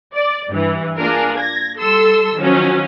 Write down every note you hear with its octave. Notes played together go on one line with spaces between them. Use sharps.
D5
G2 E3
A#3 D4 F4 G#4 A#4
G#6 A#6
G3 A4 C6 E6
D#3 F3 F#3 C#4